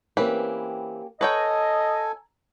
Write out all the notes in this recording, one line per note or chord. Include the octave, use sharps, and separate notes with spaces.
E3 A#3 C4 C#4 G4 B4
A4 B4 C#5 D#5 G5 G#5 A#5